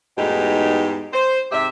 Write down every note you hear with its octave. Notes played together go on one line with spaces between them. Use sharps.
E2 G#2 B2 A3 D#4 G4
C5
G#2 C3 G4 E5